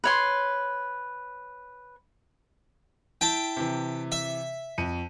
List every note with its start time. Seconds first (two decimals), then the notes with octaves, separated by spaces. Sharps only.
0.04 B4 C#5 C6
3.21 E4 G5 A5
3.57 C3 E3
4.12 E5
4.78 F2 C#7 D#7